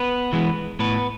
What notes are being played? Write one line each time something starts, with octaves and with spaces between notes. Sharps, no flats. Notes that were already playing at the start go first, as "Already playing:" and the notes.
Already playing: B3 B4
E3 G#3 B3
A2 B3 B4